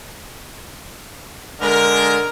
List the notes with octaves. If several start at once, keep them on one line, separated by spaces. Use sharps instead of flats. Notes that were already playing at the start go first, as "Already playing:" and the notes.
D3 G#3 A#4